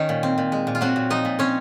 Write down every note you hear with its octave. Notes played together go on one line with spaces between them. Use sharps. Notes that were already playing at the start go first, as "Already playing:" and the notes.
Already playing: D#3 C#4 D#4 C#5
A#2
C4
A#2
G#3
A#2
F4
F#3 C4 F#4
A#2
F3 D#4 D#5
A#2
C4 C#4 C#5